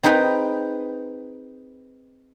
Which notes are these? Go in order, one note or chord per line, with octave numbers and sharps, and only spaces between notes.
C4 D#4 G#4 B4 G5